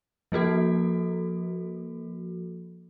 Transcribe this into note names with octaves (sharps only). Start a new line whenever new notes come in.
F3 A#3 F#4 A4